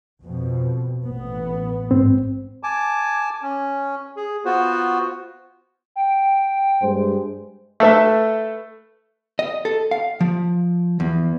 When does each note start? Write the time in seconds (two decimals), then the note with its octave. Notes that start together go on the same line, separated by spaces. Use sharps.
0.22 F2 B2
1.05 A1 B3
1.91 G#2 C4
2.63 G#5 A5 D6
3.42 C#4
4.17 G#4
4.45 B3 F4 F#4 C5
5.96 G5
6.81 G2 G#3 C5
7.80 A3 A4 B4 E5
9.39 D#5
9.65 A4
9.91 F5
10.21 F3
11.00 E2